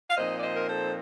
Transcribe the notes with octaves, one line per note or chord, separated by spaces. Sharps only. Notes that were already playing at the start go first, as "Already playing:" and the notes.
F5
A#2 F3 C4 D#4 C5 D#5
D5
C5 D#5
A#4
A4 C5